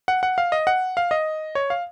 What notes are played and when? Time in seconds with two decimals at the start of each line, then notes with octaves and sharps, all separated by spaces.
0.08 F#5
0.23 F#5
0.38 F5
0.52 D#5
0.67 F#5
0.97 F5
1.11 D#5
1.55 C#5
1.70 F5